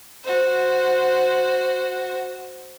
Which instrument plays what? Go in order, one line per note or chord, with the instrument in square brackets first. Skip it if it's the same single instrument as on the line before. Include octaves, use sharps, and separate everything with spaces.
[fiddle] F#4 C5